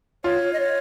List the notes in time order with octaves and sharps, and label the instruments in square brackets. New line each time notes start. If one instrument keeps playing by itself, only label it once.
[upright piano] F4 [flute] C#5
[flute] D#5
C#5